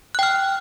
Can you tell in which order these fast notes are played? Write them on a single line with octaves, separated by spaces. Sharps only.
F#6 G5 F6